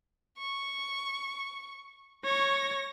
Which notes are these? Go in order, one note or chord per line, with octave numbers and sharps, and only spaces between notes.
C#6
C#5 C#6 A#6